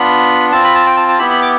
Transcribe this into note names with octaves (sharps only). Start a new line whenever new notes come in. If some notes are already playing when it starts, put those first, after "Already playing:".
Already playing: B3 D4 F4 B5
C4 F4 A5
B5
A5
G5
A5
A5
B3 E4 G4 B5
B5
D6